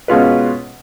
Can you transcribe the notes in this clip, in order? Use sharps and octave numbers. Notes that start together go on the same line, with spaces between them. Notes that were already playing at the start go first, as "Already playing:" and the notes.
B2 G#3 C#4 F4 B4